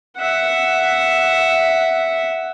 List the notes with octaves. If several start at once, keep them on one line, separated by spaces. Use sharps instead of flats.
E5 F#5